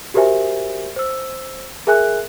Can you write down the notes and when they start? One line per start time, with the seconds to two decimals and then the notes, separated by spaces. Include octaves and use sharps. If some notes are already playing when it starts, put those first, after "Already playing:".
0.14 F#4 G4 A#4 C5 E5 G#5
0.96 C5 E6
1.87 G#4 A#4 E5 G#5 F#6